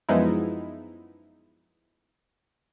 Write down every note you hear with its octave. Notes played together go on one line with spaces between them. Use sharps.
F#2 F3 G#3 B3 D#4 E4